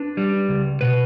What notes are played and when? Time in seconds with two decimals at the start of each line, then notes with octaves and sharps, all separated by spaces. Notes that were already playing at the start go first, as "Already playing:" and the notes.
Already playing: D4 B4
0.17 G3
0.49 C#2
0.81 B2 B4